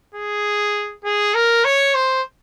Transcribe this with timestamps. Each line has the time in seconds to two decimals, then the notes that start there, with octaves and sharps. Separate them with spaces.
0.15 G#4
1.05 G#4
1.35 A#4
1.64 C#5
1.95 C5